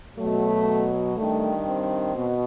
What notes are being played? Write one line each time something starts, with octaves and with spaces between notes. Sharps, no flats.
B2 F#3 A3
G2 D#3 G3 A3
C4
B2